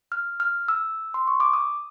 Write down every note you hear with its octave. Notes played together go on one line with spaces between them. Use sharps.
F6
F6
E6
C6
C#6
D6
D#6